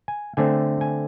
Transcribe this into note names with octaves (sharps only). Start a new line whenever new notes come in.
G#5
D3 A3 C4 G#5
G#5